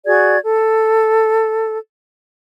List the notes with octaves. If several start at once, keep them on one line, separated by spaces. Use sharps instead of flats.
F#4 G#4 D5 G#6
A4